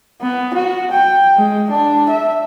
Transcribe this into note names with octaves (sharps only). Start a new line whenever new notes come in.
B3
F#4
G5
G#3
D4
E5